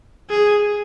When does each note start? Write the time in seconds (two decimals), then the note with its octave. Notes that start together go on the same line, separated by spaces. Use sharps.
0.30 G#4